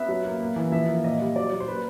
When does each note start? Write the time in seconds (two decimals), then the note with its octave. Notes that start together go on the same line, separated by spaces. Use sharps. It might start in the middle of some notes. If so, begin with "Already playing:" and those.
Already playing: B3 E5
0.08 F#3
0.25 A#3
0.40 A#3
0.56 E3
0.72 F3 E5
0.88 A#3
1.04 A#2 D#5
1.20 G3
1.36 F#3 D5
1.52 F#3
1.60 C5
1.68 A#3 B4